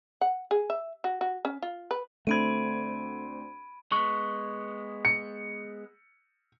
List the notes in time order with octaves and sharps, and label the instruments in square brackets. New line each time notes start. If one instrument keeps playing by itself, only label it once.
[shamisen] F#5
G#4
E5
F#4
F#4
C#4
F4
B4
[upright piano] D2 C4 G#6 [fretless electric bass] A3 [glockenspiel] B5 D7 D#7
[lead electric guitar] G#3 B3 [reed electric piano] C#6
[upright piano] C#7